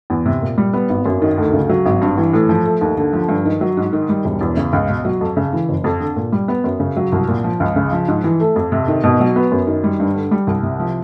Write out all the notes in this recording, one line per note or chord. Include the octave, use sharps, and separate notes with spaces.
E2
C3
A#2
G3
B3
G#1
F#2
D#3
D2
C#3
F#3
G#1
G2
E3
A2
F3
A3
D#2
D3
F3
G2
D#3
F#3
G#2
D#3
G3
E1
E2
C#3
C#2
B2
F#3
F2
C#3
E3
F#1
F2
D3
A#2
G3
B3
F#2
C#3
F#3
C2
A#2
F3
C#2
C#3
F3
G#2
E3
A3
F2
C3
D#3
B2
F#3
B3
F#2
D#3
G3
G2
D3
G3
C2
C3
F3